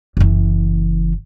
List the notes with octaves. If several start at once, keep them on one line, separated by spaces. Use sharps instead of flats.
F#1 E3